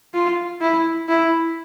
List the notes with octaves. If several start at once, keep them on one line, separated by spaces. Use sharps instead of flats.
F4
E4
E4